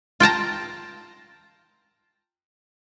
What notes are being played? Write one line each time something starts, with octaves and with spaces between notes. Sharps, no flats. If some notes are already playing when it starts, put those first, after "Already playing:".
F4 G5 A5 A#5